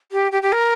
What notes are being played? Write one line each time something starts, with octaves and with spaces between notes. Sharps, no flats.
G4
G4
G4
A#4